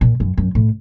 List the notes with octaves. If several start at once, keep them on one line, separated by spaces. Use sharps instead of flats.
A#2
F#2
F#2
A2